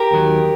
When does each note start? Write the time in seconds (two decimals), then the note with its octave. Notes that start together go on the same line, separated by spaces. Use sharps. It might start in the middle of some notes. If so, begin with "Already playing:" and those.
Already playing: G4 A#4
0.11 D#2 D#3 F#3